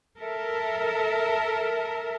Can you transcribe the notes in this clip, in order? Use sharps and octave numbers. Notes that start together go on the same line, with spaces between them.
A4 A#4 E5